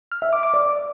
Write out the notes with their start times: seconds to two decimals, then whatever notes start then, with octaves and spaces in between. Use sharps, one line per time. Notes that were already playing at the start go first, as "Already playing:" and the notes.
0.12 F6
0.22 E5
0.33 D6
0.43 D6
0.54 D5